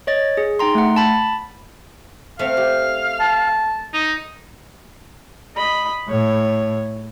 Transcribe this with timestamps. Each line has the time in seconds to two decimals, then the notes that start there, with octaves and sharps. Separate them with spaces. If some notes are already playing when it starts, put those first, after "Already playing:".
0.07 C#5 D#5 A6
0.37 G#4
0.59 D#4 G5 A#5 C6
0.75 A3 F#5
0.96 A5 B5 A6
2.39 A3 C4 F5
2.57 G4
3.20 A5
3.93 D#4
5.56 D#5 B5
6.09 A2 C#5